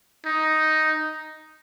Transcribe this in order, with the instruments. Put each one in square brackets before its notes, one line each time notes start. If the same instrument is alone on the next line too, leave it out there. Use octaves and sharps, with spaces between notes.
[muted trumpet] D#4